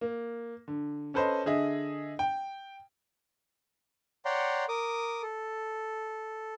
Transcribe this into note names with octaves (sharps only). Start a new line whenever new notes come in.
A#3
D3
C#4 A4 B4 C5 D#5
D3 G#4 D#5 E5
G5
C#5 D5 F#5 G5 A#5 C6
A#4 D6 D#6
A4